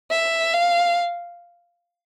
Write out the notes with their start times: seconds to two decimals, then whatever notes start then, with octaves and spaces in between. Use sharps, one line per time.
0.11 E5
0.53 F5